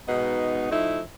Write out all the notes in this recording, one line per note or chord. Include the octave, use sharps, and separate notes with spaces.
G#2 B2 B3 D#4
F3 A3 D#4 E4